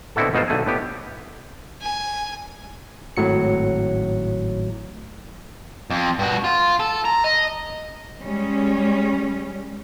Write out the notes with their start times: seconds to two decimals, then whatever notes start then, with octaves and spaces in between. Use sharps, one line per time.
0.16 B2 D3 C4 E4 F#4 A4
0.33 G1 B2 G#3 D#4 F4 C5
0.48 B1 D3 A3 G#5
0.66 A2 B3 G4
1.82 G#5
3.17 G#1 A2 F#3 C#7
5.90 F2
6.19 G2 F#4
6.44 F4
6.80 A4
7.05 A#5
7.24 D#5
8.22 G3 G#3 C#4